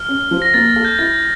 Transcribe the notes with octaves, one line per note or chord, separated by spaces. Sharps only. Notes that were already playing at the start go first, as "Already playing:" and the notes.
Already playing: F6
C#4
F3
A#6
A#3 A6
A6
A4
G6
E4 A6